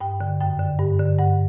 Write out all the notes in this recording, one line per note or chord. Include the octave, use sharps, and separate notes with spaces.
G2 G5
D3
F#2 G5
D3
G2
D3
G2 F#5